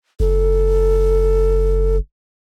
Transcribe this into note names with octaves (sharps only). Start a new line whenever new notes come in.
F#1 A4